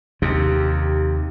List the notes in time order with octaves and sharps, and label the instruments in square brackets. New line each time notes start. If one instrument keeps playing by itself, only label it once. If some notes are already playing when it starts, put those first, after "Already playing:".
[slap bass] D#2 C3